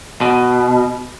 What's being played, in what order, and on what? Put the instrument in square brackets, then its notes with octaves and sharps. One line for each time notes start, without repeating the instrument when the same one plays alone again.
[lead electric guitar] B2